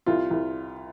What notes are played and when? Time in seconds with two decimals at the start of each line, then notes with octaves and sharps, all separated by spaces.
0.06 C2 F4
0.31 C2